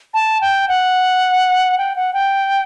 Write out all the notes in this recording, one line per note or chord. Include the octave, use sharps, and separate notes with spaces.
A5
G5
F#5
G5
F#5
G5